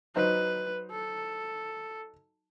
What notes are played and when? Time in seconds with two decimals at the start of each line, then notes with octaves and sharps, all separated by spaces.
0.16 F#3 D#4 B4 C5
0.91 A4